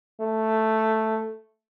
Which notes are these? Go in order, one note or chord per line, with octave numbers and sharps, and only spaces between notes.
A3